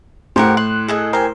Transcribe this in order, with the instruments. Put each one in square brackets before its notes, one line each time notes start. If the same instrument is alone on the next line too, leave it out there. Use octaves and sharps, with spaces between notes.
[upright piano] A2 [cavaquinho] G4 A#4 F#5 [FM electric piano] C5
[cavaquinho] C6 [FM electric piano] F#6
[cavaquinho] G#4 A4 D#5
[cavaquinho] G4 G#5 [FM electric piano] A#4 C5 C6